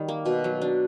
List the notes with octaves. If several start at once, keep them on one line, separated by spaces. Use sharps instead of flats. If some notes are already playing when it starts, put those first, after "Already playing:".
Already playing: D#3 G3
A#3
B2
F#3
D4